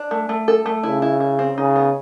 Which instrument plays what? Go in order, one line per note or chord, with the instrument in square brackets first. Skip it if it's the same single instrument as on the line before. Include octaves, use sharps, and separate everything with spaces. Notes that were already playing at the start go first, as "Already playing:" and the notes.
Already playing: [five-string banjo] D4
A3
A3
A4
A3
[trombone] C#3 [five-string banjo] E4
[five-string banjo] E4
E4
C4
[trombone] C#3 [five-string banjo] D#4
[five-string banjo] B3